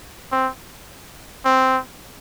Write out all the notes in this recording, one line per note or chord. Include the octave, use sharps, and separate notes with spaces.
C4
C4